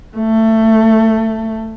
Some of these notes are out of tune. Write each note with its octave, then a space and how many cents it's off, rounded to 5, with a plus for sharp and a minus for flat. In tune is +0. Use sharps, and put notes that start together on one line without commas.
A3 +15